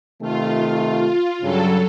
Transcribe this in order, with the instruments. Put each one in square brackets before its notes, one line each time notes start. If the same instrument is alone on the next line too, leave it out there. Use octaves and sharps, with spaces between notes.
[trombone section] C3 D#3 A3 [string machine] F4
[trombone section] G2 C#3 [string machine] F#3 A4